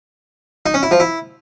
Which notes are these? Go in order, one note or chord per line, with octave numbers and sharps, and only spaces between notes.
D#4
C#4
E4
F3
E4